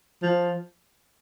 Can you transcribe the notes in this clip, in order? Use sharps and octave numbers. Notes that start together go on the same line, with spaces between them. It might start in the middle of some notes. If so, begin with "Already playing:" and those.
F3